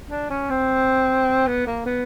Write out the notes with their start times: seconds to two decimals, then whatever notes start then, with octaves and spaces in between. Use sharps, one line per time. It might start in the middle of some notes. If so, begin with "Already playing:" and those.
0.10 D4
0.30 C#4
0.50 C4
1.47 B3
1.67 A#3
1.86 B3